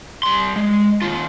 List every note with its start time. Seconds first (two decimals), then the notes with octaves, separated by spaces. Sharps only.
0.23 G3 C6
0.56 G#3
1.02 D#2 F4